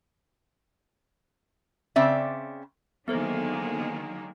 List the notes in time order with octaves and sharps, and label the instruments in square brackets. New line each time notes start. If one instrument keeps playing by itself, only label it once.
[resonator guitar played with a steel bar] C#3 C4 D5 E5
[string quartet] D3 G#3 [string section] D#3 F#3 A#3 [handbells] B3 A4 C5